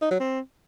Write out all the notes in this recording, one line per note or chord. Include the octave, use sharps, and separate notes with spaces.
D#4
F#3
C4